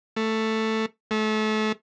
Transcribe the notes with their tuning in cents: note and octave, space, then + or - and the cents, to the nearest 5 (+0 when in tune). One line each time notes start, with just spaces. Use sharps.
A3 +5
A3 -30